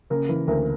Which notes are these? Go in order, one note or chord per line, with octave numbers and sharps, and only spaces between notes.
C#3 A#3 A#4
E3
D2 A#3 A#4